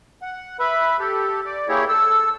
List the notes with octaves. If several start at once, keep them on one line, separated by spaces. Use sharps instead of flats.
F#5
B4 E5 B5
G4 A4
D5
A#3 E4 G4 G#4 C#5
A4 E6